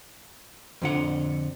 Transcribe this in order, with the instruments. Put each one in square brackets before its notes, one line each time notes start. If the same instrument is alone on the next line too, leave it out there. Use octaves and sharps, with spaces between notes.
[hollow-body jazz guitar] F2 D3 F#5